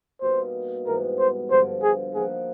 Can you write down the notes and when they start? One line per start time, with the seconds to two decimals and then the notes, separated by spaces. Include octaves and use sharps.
0.22 B2 G3 A#3 D#4 C5
0.86 G#2 E3 G3 B3 A#4
1.19 C5
1.50 G2 D3 F3 C5
1.83 G#4
2.14 F3 A#3 D#4 F#4 G#4